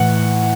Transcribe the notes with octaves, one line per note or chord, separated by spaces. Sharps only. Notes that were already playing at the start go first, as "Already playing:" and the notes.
Already playing: A2 E3 F#5